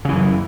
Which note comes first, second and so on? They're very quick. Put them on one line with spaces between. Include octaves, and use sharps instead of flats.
C#3 E3 F#2